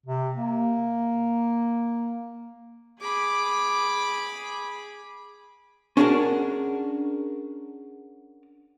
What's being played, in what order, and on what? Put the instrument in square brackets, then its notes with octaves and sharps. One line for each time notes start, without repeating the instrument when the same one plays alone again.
[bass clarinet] C3
A#3
[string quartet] G#4 B5 D6
[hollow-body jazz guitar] C#4 D4 F#4 G#4 A#4 A5